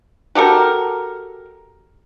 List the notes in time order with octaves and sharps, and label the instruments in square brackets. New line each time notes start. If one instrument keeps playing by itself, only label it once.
[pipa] F#4 G4 A4 A#4